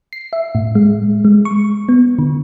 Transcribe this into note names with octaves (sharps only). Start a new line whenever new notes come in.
C7
E5
A2
G#3
G#3
C#6
B3
D3